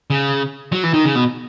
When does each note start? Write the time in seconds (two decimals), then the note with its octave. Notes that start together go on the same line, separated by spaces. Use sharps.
0.10 C#3
0.72 F#3
0.83 E3
0.94 D#3
1.04 C#3
1.15 B2